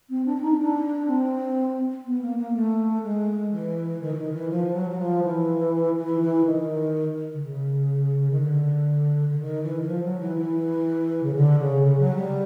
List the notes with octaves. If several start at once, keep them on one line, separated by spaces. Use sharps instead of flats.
C4
D4
D4
D#4
C#4
D4
C4
B3
A#3
A#3
A3
G#3
E3
D#3
E3
D#3
E3
F3
F#3
F#3
F3
E3
E3
E3
D#3
D3
C#3
D#3
D3
D3
D#3
E3
E3
F3
F#3
E3
E3
C#3
D3
C#3
C#3
F#3
G3